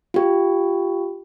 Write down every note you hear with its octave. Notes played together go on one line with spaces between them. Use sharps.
F4 G4